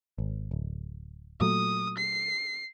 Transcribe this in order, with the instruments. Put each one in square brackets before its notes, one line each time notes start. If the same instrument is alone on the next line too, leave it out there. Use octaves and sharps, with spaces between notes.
[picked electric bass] G#1
D1
[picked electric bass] A#2 F#3 A3 [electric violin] D#6
[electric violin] C7